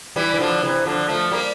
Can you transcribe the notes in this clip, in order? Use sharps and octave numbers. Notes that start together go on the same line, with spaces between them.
E3 G3
E3
D3 F3
C3 E3
D3 F3
F3 A3
G3 A#3